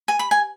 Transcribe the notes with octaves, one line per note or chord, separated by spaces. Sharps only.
G#5
B5
G#5